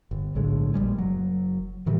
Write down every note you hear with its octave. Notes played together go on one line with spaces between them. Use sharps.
G1
B1 A2 D3 G#3
A#1 G3 G#3
F#1 F#3
A2 D#3 E3 G3